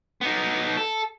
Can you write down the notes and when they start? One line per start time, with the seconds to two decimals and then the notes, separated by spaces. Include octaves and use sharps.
0.21 B3 D#4
0.77 A4